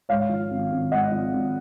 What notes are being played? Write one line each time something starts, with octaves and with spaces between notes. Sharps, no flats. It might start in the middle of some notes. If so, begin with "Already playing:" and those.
G#2 C#5 F5
F3
G#1
G#1
G#2 D#5 F#5
F3
G#1